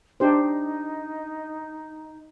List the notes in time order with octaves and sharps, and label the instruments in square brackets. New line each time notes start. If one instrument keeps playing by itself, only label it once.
[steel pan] D4 G4 C5 [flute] D#4